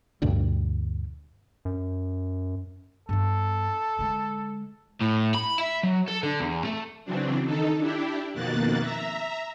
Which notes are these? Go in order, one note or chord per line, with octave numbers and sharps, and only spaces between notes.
D2 G2 B2 D3
F#2
G2 B3 A4
D3 G#3
A2
B5
E5
F#3
A4
D3
E2
A3
C#3 E3 F#3 C4 D4
D#3 D#4 A4
D4 E4 G4
F2 B2 D#3 A#3 F#6 A6
E5 A#5